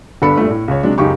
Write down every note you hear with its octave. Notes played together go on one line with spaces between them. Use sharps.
G1 B3 D4 A4 B5 C#7
G2 A#2 A3
A2
C#2 C#5
C3 F#3 G#3 D4
C#2 F#2 D#4 G4 C#6